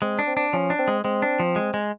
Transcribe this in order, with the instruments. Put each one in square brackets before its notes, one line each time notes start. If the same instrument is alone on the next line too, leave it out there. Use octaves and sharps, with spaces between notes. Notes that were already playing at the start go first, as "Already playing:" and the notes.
[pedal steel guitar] G#3 [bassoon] C4
[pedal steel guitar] D4
[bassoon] C4
[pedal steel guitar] D4
[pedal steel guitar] F3 [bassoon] C#4
[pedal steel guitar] D4
[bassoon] C4
[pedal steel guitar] G#3
[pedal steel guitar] G#3 [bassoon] C4
[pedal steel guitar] D4
F3
G#3
G#3